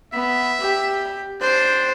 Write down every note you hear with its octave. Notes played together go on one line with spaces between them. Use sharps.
B3 E5
G4
D4 C5